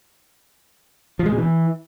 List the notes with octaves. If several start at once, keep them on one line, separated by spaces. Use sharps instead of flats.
F3
G#3
B2
E3